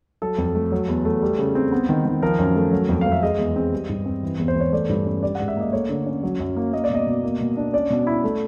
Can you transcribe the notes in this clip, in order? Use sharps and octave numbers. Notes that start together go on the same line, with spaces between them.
F#3 A4
F2
A3
F#3
E2
A3
G3
C#3
C4
B3
D#3
D#3
F3 A#4
F#2
A3
F#3
F2
F2 F5
E5
G#3 D#5
E2
C4
G3
G2
C4
E3
E2
C5
E2 C#5
A3 D5
G2
C#4
G3 D5
F#5
G#2
E5
A#3 D#5
A3 C#5
D3
C#4
F#3
F#2
A#3
A#3 D#5
D5
B2 D#5
B2
A#3
B2
D4
C#4 D5
B2
E4
A3